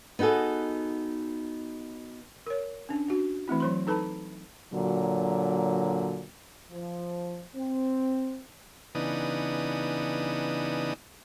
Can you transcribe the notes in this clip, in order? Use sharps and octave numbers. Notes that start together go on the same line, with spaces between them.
B3 D#4 F#4 G#4 A4
A#4 C#5
C#4 D4
D4 F#4
E3 A3 C4 E4
F#3 C5 C6
D#4 A4 B4 A5 B5
A#2 D3 F#3
F3
C4
C#3 E3 B3 D4 D#4 D#6